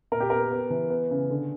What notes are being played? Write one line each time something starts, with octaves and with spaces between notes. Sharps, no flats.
A#2 A#4
G4
B3 A#4
B3
E3
B3
C#3
D3